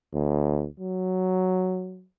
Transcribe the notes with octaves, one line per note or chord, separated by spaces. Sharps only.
D2
F#3